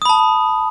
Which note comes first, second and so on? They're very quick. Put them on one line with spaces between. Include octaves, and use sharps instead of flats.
D#6 B5 A5